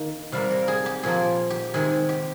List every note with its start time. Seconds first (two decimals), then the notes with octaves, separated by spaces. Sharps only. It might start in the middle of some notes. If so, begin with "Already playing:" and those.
Already playing: D#3 A#3
0.32 C3 G3 A#3 F5
0.51 A#4
0.68 G#4
0.86 G4
1.03 A#2 F3 A#3 G#4
1.50 G4
1.74 C3 D#3 G#3 G#4
2.09 G4